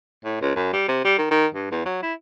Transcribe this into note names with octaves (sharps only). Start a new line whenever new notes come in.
A2
C#2
F#2
G3
C3
G3
D#3
D#3
G2
E2
F#3
E4